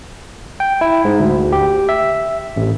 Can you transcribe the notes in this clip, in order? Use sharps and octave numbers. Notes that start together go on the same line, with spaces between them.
G5
E4
G#2
D2
G4
E5
A1